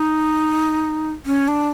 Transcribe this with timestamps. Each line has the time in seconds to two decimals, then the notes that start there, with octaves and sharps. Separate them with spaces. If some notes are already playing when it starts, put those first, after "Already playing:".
Already playing: D#4
1.26 C#4
1.48 D4